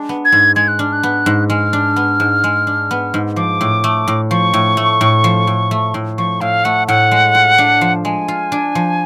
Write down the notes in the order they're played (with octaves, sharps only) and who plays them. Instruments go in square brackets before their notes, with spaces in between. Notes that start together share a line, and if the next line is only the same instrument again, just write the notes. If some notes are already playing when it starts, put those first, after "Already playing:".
Already playing: [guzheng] G#3 D4
B3
[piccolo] G#6
[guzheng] G#2
[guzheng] G#3 [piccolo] G#6
[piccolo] F#6
[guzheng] D4 [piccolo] F6
[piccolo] F#6
[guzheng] B3
G#2
[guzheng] G#3 [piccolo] F6
[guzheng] D4
B3
G#2
G#3
D4
B3
G#2
[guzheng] F3 [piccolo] D6
[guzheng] A2
A3
A2
[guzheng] F3 [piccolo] C#6
[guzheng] A2
A3
A2
F3
A2
A3
A2
[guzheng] F3 [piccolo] C#6
[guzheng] A2 [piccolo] F5
[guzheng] A3 [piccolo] F#5
[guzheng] A2 [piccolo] F#5
[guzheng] G#3
F4
D4
F3
[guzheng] G#3 [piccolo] G#5
[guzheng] F4
D4
F3